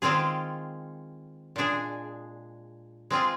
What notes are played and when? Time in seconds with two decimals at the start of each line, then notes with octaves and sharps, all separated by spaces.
0.02 D#3 G#3 C4 F4 G#4
1.56 A#2 G#3 D4 G#4
3.10 G#3 C4 F4 G#4